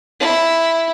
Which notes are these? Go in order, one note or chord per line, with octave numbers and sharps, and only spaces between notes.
E4